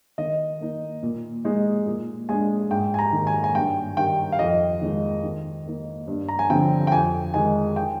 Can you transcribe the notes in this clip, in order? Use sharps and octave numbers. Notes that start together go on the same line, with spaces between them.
D#3 D#5
A#3 D#4
A#2
G#3 D#4
A#2
G#3 D4 G#5
G#2 G5
G#5
A#5
D#3 A#3
G#5
G#5
G2 G5
D#3 G3 G5
F5
F2 D#5
D#3 G#3 D#4
D#3
A#3 D#4
G2
A#5
G#5
D3 F3 C4 G5
G5
F2 G#5
D#3 G#3 D#4 G#5
G5